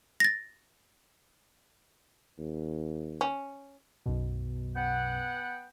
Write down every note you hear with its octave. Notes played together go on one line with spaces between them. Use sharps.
A6 A#6
D#2
C#4
B1 F#2 B2
B3 F#5 G5